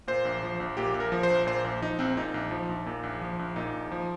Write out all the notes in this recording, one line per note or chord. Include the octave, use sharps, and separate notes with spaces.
A#2 C5
A#1
F3
A#1
A#2 G4
A#1
A#4
F3
C5
A#1
A#2 C5
A#1 C5
F3 D#4
A#1 C4
A#2 D#4
A#1
F3
A#1
A#2
A#1
F3
A#1
A#2 D#4
A#1
F3